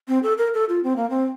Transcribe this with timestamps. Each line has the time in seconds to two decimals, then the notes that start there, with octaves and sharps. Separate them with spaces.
0.08 C4
0.23 A4
0.38 A#4
0.54 A4
0.69 F4
0.84 C4
0.96 A#3
1.10 C4